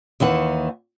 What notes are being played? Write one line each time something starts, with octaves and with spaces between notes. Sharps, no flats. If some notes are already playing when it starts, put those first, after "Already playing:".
D#2 D#3 E3 F#5